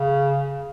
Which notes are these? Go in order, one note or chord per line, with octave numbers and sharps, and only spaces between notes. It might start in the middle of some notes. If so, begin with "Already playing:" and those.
Already playing: C#3